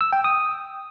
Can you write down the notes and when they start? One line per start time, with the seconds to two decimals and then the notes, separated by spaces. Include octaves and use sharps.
0.01 E6
0.13 G5
0.24 D#6